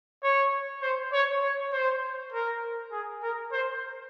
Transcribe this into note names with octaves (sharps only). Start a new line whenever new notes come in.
C#5
C5
C#5
C#5
C5
A#4
G#4
A#4
C5